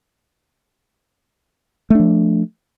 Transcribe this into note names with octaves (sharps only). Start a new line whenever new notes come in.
F3 A3 D4